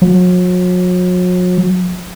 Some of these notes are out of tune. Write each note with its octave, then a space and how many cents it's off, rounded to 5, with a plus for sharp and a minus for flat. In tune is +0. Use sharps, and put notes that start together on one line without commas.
F#3 -40